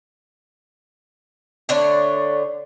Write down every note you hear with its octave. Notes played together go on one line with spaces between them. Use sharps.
D3 A3 D4 C#5